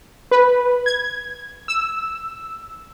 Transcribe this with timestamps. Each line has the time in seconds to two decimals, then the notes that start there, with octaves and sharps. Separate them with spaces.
0.31 B4
0.86 G#6
1.68 E6